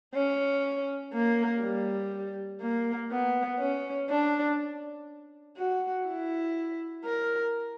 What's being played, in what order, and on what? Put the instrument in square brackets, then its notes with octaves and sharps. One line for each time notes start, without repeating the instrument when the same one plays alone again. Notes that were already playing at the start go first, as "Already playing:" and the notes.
[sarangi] C#4
A#3
G3
A#3
B3
C#4
D4
F#4
E4
A#4